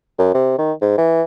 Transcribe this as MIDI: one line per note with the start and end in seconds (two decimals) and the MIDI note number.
0.19 0.31 42
0.35 0.54 48
0.58 0.73 51
0.82 0.97 44
0.98 1.22 52